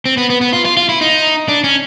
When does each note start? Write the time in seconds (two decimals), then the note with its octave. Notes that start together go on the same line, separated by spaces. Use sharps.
0.05 C4
0.17 B3
0.30 B3
0.41 B3
0.53 F4
0.65 F4
0.77 F4
0.89 E4
1.01 D#4
1.48 D4
1.64 C#4